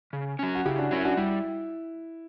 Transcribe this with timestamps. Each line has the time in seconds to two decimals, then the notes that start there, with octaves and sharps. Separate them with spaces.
0.13 C#3
0.39 F#3 C#4
0.55 F#4
0.65 C#3 E4 G4
0.78 D4 F#4
0.91 F#3 C#4 E4
1.04 D4 F#4
1.17 G3 E4